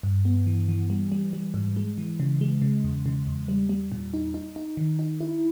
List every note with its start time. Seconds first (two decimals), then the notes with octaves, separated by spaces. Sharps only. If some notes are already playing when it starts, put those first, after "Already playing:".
0.03 G2
0.25 B3
0.47 E3
0.69 E3
0.90 G3
1.12 G3
1.33 G3
1.54 G#2
1.76 G#3
1.98 E3
2.20 C#3
2.41 G#3
2.62 C#3
2.84 E2
3.06 C#3
3.27 E2
3.48 G3
3.69 G3
3.92 A#2
4.14 D#4
4.34 D#4
4.56 D#4
4.77 D#3
4.99 D#4
5.21 E4